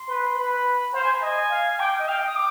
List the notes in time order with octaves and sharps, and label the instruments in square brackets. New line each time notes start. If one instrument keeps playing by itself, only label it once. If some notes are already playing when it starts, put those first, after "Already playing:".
Already playing: [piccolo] C6
[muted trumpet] B4
[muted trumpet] B4 [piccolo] B5
[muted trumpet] C5 [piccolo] F5
[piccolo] G#5
B5
[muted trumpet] D#5 [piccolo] G#5
[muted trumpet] F5
[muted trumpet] G5 [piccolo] D6
[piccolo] D#5
[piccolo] F5 [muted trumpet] G5
[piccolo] D#6
D6